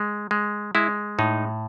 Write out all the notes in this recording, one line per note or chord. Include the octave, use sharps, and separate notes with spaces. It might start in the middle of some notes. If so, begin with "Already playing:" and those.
Already playing: G#3
G#3
G#3 E4
A2 D#4